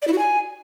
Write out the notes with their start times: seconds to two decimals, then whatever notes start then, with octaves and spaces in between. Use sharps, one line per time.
0.02 D5
0.07 E4
0.13 F#4
0.18 G#5